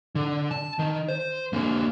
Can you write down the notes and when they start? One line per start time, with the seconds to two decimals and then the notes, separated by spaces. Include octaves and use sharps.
0.15 D3
0.51 A5
0.79 D#3
1.08 C5
1.53 D3 A#3